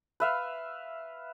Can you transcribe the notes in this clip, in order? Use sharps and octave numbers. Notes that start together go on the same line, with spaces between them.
B4 E5 F5